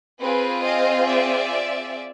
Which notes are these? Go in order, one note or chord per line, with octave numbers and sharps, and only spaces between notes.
C4 F4 G#4 B4
D#5 F5
D5 E5